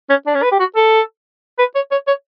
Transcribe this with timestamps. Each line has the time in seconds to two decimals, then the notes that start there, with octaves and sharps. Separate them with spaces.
0.10 C#4
0.27 D4
0.35 C#4
0.43 B4
0.51 G4
0.59 F#4
0.76 A4
1.59 B4
1.75 C#5
1.91 C#5
2.07 C#5